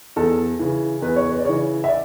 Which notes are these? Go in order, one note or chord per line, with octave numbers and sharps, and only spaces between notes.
E2 A4
C#3 E3
E2 B4
C#5
B4
D5
C#3 E3 C#5
E5
D5